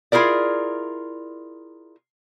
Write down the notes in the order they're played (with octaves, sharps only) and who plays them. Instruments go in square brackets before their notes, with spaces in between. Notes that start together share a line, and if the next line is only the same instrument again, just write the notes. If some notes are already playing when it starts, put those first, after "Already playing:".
[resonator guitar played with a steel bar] E4 F4 G#4 A#4 D5